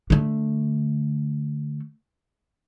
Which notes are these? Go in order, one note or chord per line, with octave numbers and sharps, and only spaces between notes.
D3 A3